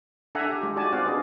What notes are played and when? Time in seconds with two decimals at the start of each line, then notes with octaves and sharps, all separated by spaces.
0.35 D4 A4 E5 F#5 G#5 A#5
0.49 G4
0.61 G#3 F4 G4
0.76 D#4 F#4 D5 G#5 A5
0.93 C4 F4 D5 F5 F#5
1.05 D4 F#4 G#4 B4 D#5